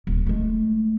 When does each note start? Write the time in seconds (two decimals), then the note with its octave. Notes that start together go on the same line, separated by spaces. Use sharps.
0.07 D#1
0.26 G#3 A3